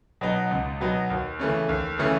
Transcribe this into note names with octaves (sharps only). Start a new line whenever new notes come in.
B2 F#3 B3 D#4
C#2
B2 F#3 B3 D#4
D#2
C#3 E3 A3 C#4
D#2
C#3 E3 A3 C#4